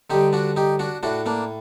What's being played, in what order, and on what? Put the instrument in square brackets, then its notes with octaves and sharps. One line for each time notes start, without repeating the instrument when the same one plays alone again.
[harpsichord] G2 D3 D#4 G4
D4 F#4
D#4 G4
D4 F#4
A2 D4 F#4
A#3 D4